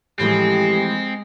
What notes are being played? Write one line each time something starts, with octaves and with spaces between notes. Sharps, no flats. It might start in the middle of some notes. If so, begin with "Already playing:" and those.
A2 E3 F3 G#3 C4 G4